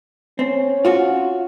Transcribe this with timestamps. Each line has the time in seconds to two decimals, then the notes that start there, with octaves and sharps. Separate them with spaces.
0.39 C4 C#4
0.85 F4 F#4